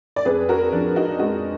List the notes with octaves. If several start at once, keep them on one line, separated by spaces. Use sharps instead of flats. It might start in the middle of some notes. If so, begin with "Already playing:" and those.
D5
F2 G#4 B4
F#4 A#4
F3 D4
D#4 F#4
G#3 D#4 F#4